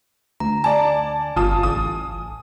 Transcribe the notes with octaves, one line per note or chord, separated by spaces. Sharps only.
D2 A#5
D5 G#5 A5
G1 F4 A5 D#6
A1 D#6